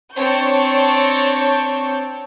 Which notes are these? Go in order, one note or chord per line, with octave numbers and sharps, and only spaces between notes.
C4 D4 C#5 A5 C#6 G6